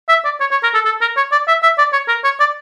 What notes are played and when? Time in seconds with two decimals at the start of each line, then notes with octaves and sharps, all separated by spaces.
0.09 E5
0.25 D5
0.40 C#5
0.51 C#5
0.63 A#4
0.74 A4
0.85 A4
1.01 A#4
1.17 C#5
1.32 D5
1.48 E5
1.63 E5
1.78 D5
1.93 C#5
2.08 A#4
2.24 C#5
2.40 D5